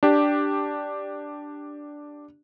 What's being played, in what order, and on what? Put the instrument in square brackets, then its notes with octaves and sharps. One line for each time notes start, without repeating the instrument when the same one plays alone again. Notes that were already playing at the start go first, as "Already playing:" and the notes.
[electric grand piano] D4 G4